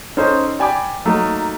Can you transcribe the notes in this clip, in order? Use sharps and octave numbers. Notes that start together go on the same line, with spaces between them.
C#4 D#4 A4 C5
D5 G5 G#5 B5 D6
F#3 A3 A#3 D#4